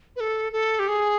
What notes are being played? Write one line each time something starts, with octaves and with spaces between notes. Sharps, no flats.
B4
A4
A4
G4
G#4